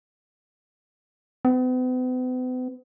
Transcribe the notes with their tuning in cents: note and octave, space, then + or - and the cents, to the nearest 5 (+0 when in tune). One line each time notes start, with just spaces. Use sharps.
B3 +45